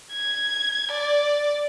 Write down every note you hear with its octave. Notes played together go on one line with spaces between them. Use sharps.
G#6
D5